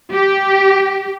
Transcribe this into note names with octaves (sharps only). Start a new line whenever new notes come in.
G4